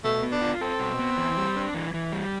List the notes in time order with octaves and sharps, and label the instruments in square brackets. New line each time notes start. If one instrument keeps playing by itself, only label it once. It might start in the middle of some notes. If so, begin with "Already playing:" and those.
[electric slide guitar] B2 [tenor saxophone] A3
[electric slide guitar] B3
[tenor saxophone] D4
[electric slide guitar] F4
[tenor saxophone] C4 [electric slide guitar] A4
[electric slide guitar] B2
B3
E3
G3
D4
E3
E3
G3